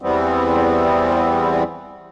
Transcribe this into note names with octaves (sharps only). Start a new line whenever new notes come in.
E2 E3 G3 B3 C4